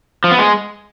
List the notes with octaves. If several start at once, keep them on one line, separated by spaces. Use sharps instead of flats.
F3
B3
G#3